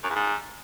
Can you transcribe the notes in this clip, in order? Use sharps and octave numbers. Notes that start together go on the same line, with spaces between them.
F#2
E2
G#2